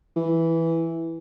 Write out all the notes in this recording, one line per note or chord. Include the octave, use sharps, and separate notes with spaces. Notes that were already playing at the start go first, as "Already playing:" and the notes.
E3